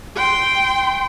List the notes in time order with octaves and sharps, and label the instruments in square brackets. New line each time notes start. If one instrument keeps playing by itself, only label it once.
[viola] G5 C6